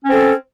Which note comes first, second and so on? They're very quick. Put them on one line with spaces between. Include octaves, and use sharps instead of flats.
C#4 C4 A4